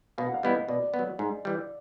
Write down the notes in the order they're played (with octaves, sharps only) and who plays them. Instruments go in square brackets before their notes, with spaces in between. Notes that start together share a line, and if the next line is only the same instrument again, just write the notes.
[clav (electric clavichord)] B2 [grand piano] F5
[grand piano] F#5
F5
[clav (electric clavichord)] G3 B3 E4 [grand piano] D#5
[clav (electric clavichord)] B2 [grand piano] D5
[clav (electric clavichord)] B3
F#3
G#2
E3 G3